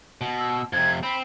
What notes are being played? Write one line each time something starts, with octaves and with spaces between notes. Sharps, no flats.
B2
E6
F2 C3 G#6
C4 B5